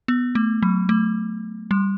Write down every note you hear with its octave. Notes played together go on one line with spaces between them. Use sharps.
B3
A3
F#3
A3
G3